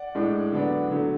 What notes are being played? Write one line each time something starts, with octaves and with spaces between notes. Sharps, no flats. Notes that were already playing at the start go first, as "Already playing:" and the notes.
Already playing: D5 F#5
A2 G#3 D4
D3 F#3 B3 D4
D3 F#3 A3